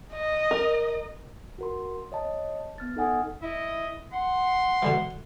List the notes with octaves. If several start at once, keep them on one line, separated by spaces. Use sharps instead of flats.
D#5
A#4
F#4 A#4 C6
C#5 D#5 A5
B3 F6 A6
D#4 A4 D#5 F#5 G#5 D#6
E4 D#5
F#5 C6
B2 D3 E3